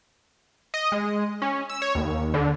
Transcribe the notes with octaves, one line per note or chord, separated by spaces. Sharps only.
D#5
G#3
C#4
E6
C#5
D#2
D3